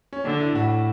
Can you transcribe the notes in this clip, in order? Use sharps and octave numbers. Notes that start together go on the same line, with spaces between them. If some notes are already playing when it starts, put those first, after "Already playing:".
C#4
D3 D4
E4
A2 F#4